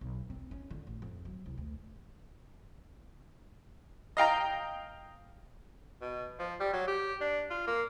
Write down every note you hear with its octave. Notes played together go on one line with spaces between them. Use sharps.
B1
C4
C#4
D3
A1
F2
F#3
C2
D2
D#5 F5 G5 A#5
B2
F3
G3
F#3
G4
D4
F4
A#3